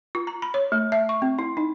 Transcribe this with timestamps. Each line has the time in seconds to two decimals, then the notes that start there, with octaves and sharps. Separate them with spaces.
0.15 F4
0.27 A#5
0.42 B5
0.54 C#5
0.72 A3
0.92 E5
1.09 C#6
1.22 C4
1.39 E4
1.57 D#4